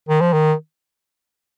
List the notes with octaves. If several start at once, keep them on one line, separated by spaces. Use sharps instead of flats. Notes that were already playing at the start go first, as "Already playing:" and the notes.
D#3
F3
D#3